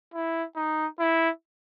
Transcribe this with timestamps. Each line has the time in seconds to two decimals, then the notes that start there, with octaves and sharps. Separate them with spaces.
0.14 E4
0.56 D#4
0.99 E4